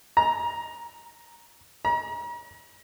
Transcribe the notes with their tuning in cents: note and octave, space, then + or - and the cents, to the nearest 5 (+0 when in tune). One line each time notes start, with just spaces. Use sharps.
A#5 +5
A#5 +40